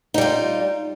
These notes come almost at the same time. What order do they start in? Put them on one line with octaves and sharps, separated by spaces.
D#4 G3 F4